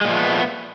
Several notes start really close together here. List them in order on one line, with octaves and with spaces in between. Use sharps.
G#3 A#2 F3 A3 B3